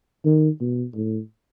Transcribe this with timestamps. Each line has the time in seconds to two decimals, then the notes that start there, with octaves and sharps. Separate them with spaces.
0.25 D#3
0.60 B2
0.95 A2